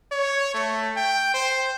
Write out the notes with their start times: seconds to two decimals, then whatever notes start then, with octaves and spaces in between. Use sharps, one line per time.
0.11 C#5
0.54 A3
0.96 G5
1.34 C5